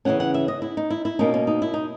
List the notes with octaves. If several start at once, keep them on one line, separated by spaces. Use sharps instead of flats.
C#3 E3 G#3 C#4 F#5
F#5
E5
D#5
E4
D#4
E4
E4
B2 A#3 C#4 D#4
C#4
D#4
E4
D#4